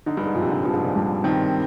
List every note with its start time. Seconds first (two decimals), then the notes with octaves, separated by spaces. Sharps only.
0.06 D3 D#4
0.17 G2
0.26 G#2
0.35 A#2 F3
0.42 C3
0.51 D3
0.63 G2 F3
0.73 G#2
0.84 A#2
0.96 G2 C3
1.24 D#3 C4